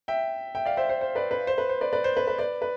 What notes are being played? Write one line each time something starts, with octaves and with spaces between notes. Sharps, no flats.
E5 G5
E5 G5
D5 F5
C5 E5
C5
C5
B4 D5
B4
C5
B4
C5
B4 D5
B4 D5
C5
B4
B4
B4 D5
B4